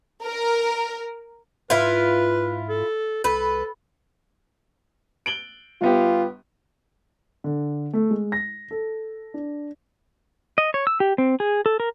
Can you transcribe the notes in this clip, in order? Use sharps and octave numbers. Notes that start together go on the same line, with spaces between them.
A#4
G#2 E4 F4 B4
A4
C2 A4 B4
D7 F#7 G7
G1 B3 F4 G4
D3
A3
G#3
A#6
A4
D4
D#5
C#5
E6
G4
C4
G#4
A4
A#4